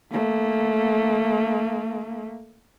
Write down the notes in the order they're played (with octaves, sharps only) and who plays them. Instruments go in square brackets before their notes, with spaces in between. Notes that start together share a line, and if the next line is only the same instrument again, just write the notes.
[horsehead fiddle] A3 A#3